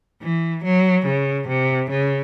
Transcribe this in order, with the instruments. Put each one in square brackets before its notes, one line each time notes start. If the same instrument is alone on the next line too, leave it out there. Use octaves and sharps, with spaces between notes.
[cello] E3
F#3
C#3
C3
C#3